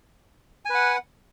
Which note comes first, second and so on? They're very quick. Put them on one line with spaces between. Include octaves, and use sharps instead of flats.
G#5 B4 F#5